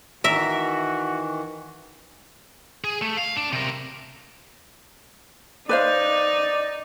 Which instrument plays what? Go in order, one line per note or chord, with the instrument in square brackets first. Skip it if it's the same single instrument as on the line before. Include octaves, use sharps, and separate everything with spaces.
[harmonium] D#3 E3 [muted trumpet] F#4 [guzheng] A#4 E5
[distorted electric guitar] G#4
A3
F5
D4
C3 A#4
[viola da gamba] D#4 [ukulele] B4 C5 F5 [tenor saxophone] D5